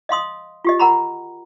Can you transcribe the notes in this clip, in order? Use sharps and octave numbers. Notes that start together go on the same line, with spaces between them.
D#5 F5 C6 D#6
F4 G4 D#5
A#4 F#5 A#5 B5